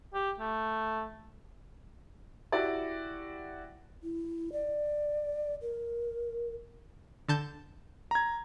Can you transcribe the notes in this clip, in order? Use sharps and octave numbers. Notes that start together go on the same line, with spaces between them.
G4
A3
E4 F#4 G4 D5
E4
D5
A#4
D3 A5 G6
A#5 G#6